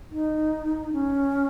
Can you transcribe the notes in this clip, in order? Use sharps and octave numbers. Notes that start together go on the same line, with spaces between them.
D#4
C#4